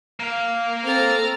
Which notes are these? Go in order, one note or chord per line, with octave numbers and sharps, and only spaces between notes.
A#3 F5
C4 A4 A#5 F6 A6